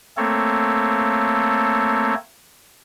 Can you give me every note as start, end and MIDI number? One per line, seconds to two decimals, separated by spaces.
0.17 2.15 57
0.17 2.15 58
0.17 2.15 60
0.17 2.15 69
0.17 2.15 73